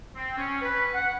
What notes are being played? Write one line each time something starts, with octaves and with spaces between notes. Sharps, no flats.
C4
C#4
B4
F#5